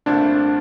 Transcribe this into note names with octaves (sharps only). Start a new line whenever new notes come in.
C2 A#2 A3 C4 D4 E4